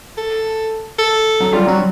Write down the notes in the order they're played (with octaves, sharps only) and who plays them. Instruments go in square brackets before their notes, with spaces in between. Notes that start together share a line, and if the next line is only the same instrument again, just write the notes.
[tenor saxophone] A4
A4
[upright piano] F#3
[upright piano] G3 [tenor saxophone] F4
[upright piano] F#3 [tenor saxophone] F#4